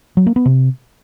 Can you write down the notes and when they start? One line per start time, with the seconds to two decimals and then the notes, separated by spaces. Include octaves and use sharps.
0.17 F#3
0.26 A#3
0.36 B3
0.46 C3